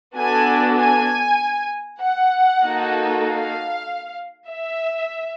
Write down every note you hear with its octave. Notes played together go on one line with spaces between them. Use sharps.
B3 D4 F#4 A4 G#5
G#5
F#5
A#3 D#4 F#4 A4
F5
E5